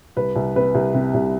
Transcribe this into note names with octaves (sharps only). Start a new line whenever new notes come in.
C2 B4
C2
C3 B4
C2
C3
C2